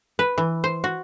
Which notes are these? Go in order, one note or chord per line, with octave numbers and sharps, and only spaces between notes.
B4
E3
C5
F#4